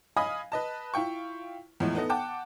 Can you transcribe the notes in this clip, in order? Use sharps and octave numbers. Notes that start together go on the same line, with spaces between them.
D#5 F5 G#5 B5 D#6
B4 D#5 A5
E4 F4 G5 C#6
E2 A2 F3 G#3 E4
B3 D#4 A4 D#5
F#5 G5 A5 D6